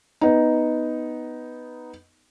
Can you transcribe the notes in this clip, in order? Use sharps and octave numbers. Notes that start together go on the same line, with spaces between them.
B3 D#4